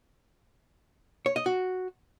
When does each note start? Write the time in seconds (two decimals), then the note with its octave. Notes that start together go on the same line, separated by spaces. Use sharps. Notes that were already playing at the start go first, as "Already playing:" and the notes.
1.26 C#5
1.36 D#5
1.46 F#4